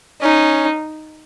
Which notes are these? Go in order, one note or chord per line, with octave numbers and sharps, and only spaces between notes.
C#4 D#4